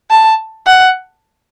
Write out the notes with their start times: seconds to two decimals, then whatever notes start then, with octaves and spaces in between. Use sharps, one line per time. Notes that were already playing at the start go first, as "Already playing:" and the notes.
0.11 A5
0.66 F#5